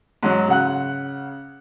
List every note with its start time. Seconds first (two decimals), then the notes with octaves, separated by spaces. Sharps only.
0.23 G#2 F#3
0.48 C#3 F#5 F#6